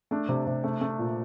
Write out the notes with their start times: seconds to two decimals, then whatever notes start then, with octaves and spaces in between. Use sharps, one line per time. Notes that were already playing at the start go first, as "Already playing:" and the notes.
0.11 A3 D4
0.29 C3
0.47 C3
0.64 A3
0.81 A3
0.99 A#2